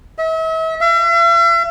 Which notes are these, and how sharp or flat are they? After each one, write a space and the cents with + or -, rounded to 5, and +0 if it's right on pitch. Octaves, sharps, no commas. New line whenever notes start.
E5 -40
E5 +45